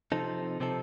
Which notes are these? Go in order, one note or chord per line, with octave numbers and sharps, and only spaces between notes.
C3 F3 C4 D#4 A4
C3 F3 C4 D#4 A4